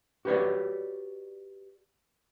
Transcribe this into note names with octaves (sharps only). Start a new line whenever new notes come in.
F#4 G4 B4 C#5 D5